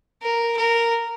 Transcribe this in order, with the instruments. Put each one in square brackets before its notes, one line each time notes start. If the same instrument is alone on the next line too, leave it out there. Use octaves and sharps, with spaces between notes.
[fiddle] A#4
A#4